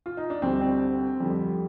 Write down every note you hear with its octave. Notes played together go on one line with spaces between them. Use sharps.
F4
D#4
D4
D2 D3 G3 C4
C4
F2 D3 G3